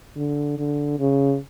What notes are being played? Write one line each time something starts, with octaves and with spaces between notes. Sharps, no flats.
D3
D3
C#3